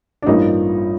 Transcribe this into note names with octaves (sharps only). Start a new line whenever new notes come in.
D4
A1 G2 F3 A#3 D#4